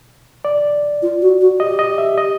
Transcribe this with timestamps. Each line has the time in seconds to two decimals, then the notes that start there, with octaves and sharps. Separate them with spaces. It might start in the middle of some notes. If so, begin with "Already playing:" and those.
0.45 D5
1.02 F4
1.22 F#4
1.41 F#4
1.60 G4 D#5
1.79 D#5
1.98 E5
2.18 D#5